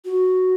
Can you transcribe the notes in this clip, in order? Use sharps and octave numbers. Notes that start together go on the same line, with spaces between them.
F#4